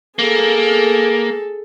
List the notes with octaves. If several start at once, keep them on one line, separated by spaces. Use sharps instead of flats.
A#3 G#4 A4